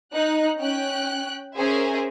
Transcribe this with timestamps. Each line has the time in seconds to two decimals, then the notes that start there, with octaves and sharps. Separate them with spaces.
0.13 D#4 F#6
0.58 C#4 G5 F#6
1.56 C#4 G#4 A#4 C5 E5 G#5